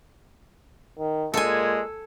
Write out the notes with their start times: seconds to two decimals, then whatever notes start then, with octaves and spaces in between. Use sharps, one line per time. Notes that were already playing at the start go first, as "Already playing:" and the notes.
0.99 D#3
1.34 A#2 G#3 A4 G#5